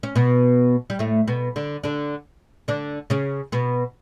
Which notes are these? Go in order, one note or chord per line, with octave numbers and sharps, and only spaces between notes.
C#4
B2 B3
G3
A2 A3
B2 B3
D3 D4
D3 D4
D3 D4
C#3 C#4
B2 B3